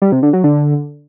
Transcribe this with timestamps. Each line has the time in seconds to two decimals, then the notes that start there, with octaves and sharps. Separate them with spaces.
0.02 G3
0.12 C3
0.23 D3
0.33 F#3
0.44 D3